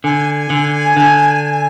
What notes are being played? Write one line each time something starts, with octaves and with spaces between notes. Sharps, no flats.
D3 G#5
D3
D3